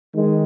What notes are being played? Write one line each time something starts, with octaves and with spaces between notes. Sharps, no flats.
D#3 G#3